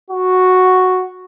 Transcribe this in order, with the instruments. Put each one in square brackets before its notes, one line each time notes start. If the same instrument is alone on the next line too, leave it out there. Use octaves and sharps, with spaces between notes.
[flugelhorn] F#4